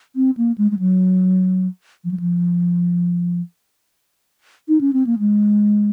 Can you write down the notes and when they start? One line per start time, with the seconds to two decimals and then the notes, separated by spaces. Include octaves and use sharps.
0.16 C4
0.37 A#3
0.58 G#3
0.71 G#3
0.79 F#3
2.04 F3
2.11 F#3
2.20 F3
4.68 D#4
4.81 C#4
4.93 C4
5.07 A#3
5.19 G#3